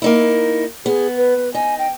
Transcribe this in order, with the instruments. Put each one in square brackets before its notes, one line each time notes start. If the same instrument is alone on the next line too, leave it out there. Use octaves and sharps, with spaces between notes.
[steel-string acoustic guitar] A#3 D#4 E4
[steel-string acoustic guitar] B3 [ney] G#4
[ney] B4
[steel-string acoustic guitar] D#4 [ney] G#5
[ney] G5